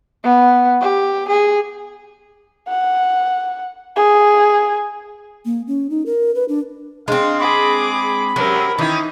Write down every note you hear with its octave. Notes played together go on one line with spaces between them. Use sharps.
B3
G4
G#4
F#5
G#4
A#3
C#4
D#4
A#4
B4
D4
G#3 C4 D4 F5
G#4 B5 D6
B5
F#2 C3 F#3 G#3 A#4
D#3 E3 C#4 D#4 E4